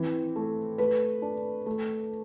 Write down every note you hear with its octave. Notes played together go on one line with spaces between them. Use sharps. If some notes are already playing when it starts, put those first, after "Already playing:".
Already playing: E3 C4
A3
A3 B4
D4
A3